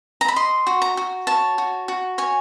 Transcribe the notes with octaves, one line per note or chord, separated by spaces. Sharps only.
A#5
B5
D#5 C6
F#4
A#5
F#4
C#5 A5
F#4
F#4
C#5 G#5